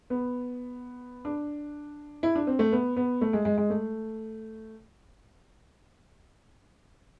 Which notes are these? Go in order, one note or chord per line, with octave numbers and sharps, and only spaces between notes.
B3
D4
E4
D4
C4
A3
B3
B3
A3
G#3
G#3
G#3
A3